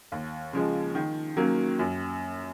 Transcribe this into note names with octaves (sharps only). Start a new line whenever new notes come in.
D#2
C#3 F3 G#3
D#3
F#3 A#3 C#4
F#2